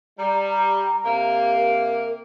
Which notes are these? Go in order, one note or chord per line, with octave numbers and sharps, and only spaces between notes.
G3 A#5
A#5
C3 A#3
A#4